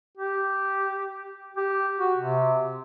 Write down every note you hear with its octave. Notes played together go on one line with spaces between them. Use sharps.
G4
G4
F#4
C3